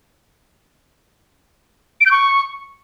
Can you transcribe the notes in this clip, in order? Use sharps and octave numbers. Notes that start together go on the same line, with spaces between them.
D7
G6
C#6